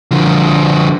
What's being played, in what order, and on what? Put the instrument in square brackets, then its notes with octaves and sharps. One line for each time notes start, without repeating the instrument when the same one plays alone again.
[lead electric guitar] D3 F3